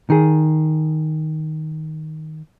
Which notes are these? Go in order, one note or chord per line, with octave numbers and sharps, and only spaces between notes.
D#3 G#4